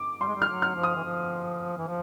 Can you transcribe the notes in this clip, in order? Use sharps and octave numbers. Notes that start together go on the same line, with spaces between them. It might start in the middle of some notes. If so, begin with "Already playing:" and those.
Already playing: D6
G3 C6
G#3
G3
F6
F#3
F6
F3
D#6
E3
F3
E3
F3